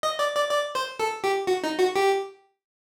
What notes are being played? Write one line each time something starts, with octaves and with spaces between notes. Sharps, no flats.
D#5
D5
D5
D5
C5
A4
G4
F#4
D#4
F#4
G4